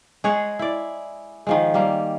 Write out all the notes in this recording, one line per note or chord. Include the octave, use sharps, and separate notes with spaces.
G#3 G#4 C#5 F#5
E4 D5
D#3 F3 G#3
G3 A#3